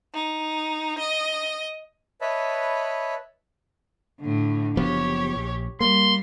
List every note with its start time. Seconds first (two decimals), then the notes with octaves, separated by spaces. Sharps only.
0.14 D#4
0.99 D#5
2.21 B4 C#5 D#5 E5 A5 B5
4.21 A2 D3
4.77 F#1 F3 B3 G4 C#5
5.36 A#1
5.81 G3 A#3 C6